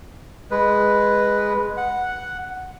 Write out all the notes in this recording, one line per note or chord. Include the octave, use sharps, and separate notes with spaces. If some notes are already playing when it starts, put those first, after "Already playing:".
G#3 B4
F#5